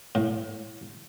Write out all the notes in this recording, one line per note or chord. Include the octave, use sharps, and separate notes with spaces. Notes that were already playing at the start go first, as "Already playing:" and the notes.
A2